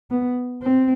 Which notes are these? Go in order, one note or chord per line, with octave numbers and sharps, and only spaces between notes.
B3
C4